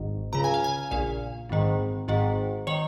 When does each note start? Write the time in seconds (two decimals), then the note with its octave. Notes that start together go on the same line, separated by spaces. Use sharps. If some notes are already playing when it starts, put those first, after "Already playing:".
Already playing: G#1 G#2 D#3
0.33 C#2 C#3 A#5
0.44 G#5
0.54 F5
0.64 G#5
0.91 A#1 A#2 F5
1.49 G#1 G#2 D#3
2.08 G#1 G#2 D#3
2.67 D#3 C#5